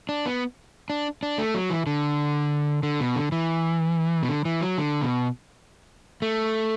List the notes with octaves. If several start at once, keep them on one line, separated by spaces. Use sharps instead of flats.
D4
B3
D4
D4
A3
F#3
E3
D3
D3
B2
D3
E3
B2
D3
E3
F#3
D3
B2
A3